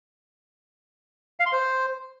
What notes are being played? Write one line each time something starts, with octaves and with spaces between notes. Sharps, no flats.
F5
C6
C5